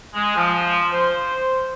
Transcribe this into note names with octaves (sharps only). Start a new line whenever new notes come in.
G#3
F3
C5